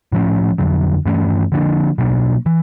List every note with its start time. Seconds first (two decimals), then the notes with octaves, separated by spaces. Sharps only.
0.12 A2 F3 A3 C#4
0.58 F2 D3 F#3
1.06 G2 E3 A3 C#4
1.52 D3 F3 A#3 D4
1.98 B2 F#3 A#3 D4
2.46 E3